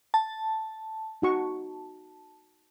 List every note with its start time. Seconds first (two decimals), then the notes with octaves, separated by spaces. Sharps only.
0.14 A5
1.22 D#4 F#4 C#6